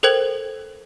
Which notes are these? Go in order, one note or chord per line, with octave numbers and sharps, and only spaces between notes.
A4 A#4 C5 G5 G#6 F#7